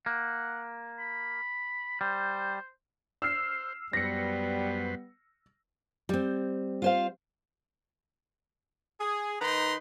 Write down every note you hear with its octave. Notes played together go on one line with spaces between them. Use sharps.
A#3 F#5
B5
G3 C5
C5 E6 F6 C7
F#2 G3 B3 B4 C5 A#6 C#7
G3 C4
F4 C5 F5
G#4
D#3 D#4 B4 A#5 C6